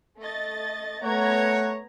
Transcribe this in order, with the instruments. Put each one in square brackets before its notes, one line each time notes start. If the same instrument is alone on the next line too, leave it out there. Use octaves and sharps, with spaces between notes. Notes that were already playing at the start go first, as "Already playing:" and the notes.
[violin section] A3 D#5 A6
[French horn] A3 [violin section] B3 A#5 G#6 [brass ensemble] C#5 [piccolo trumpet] F#5